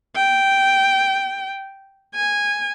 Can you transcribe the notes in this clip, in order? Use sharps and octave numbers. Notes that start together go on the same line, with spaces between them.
G5
G#5